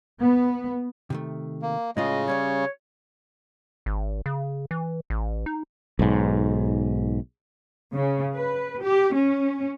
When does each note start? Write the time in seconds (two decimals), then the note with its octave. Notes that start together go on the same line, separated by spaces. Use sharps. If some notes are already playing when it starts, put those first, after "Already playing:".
0.20 B3
1.10 C3 D#3 A3
1.62 A#3
1.97 A2 C#3 G#3 F4 D#5
2.28 G3 C#4 C#5 D5
3.86 G#1
4.26 C#3
4.71 E3
5.10 A1
5.46 D#4
5.99 B1 G#2
7.93 C#3
8.34 B4
8.81 G4
9.14 C#4